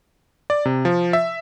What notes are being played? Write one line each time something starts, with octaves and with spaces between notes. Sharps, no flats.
D5
C3
F3
E5